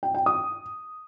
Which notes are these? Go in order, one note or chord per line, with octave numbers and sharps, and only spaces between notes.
G5
G5
D#6